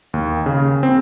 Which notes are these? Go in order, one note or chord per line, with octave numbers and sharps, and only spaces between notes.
D#2
C#3
C4